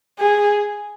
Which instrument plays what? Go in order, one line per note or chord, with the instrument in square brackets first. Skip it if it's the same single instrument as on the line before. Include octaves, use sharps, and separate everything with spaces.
[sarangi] G#4